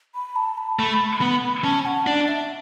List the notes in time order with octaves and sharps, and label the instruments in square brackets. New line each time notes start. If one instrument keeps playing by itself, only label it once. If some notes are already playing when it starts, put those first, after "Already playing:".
[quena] B5
A5
B5
[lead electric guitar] A3
B3
[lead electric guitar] C#4 [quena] A5
[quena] F#5
[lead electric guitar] D4 [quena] D5
[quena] E5